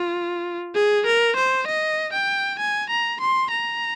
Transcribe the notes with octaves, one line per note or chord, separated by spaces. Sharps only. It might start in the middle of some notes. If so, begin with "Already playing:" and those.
Already playing: F4
G#4
A#4
C5
D#5
G5
G#5
A#5
C6
A#5